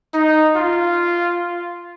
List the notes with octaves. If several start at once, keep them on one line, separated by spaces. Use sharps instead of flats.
D#4
F4